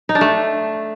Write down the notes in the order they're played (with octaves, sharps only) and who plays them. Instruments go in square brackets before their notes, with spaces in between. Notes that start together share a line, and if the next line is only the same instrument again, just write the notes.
[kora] D#4
D4
A3